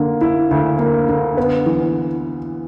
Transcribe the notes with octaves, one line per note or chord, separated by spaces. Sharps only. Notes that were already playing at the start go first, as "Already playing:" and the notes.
Already playing: D3 A#3
E4
D2
A#3
D3
B3
E3